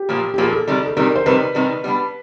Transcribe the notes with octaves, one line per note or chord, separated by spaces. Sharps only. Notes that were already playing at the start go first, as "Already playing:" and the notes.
Already playing: G4
A#2 F3 A#3
G4
A#2 F3 A#3 G#4
A4
C3 D#3 G3
A4
C3 D#3 G3 A#4
C5
C3 D#3 G3 B4
C3 D#3 G3
G3 B3 D4